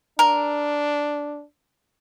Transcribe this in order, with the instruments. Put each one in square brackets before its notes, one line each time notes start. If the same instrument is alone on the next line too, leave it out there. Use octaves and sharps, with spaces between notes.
[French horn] D4 [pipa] A#4